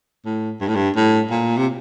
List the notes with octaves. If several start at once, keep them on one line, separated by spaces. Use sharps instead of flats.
A2
G2
A2
G2
A2
A#2
C3